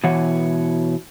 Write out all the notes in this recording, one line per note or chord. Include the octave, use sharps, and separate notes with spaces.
B2 E3 C#5 F#5